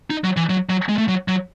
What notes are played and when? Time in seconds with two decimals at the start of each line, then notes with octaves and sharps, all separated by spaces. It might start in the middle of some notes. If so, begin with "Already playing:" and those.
0.10 D#4
0.24 F#3
0.37 E3
0.49 F#3
0.69 F#3
0.89 G#3
0.98 A3
1.08 F#3
1.28 F#3